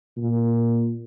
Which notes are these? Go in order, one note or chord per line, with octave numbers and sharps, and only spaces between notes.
A#2